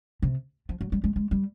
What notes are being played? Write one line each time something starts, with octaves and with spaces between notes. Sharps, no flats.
C3
F3
F#3
G3
G#3
G#3
G3